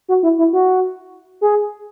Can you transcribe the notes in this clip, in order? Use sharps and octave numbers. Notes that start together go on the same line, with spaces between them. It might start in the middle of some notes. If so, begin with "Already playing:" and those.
F#4
E4
E4
F#4
G#4